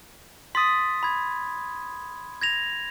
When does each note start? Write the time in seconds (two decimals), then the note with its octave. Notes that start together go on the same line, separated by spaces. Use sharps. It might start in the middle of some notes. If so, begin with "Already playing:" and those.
0.55 C6 D#6 A6 B6
1.03 B5 G#6
2.41 G#6 A#6 F7